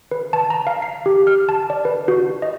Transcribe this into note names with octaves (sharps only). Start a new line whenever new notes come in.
B4
A5
A#5
F5
C7
G4
F6
A5
D5
B4
F#4
D#5